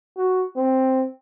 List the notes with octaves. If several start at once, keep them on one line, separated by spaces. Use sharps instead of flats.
F#4
C4